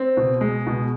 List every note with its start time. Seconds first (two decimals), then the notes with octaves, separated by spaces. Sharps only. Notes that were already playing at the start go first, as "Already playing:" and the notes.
Already playing: C4
0.17 B2
0.41 G#3
0.67 B2